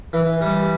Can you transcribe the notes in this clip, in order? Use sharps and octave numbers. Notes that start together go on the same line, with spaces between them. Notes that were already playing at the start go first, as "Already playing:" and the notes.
E3
G3